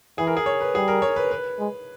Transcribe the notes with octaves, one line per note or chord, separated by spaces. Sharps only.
E3 G#4
A#4
G#4
C#5
B4
G3 G#4
A#4
C#5
B4
B4
G#3